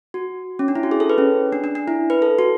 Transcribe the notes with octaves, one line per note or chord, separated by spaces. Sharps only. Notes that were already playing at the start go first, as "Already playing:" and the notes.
F#4
C#4
D4
E4
F#4
G#4
A4
B4
C#4
D4
D4
D4
E4
B4
A4
F#4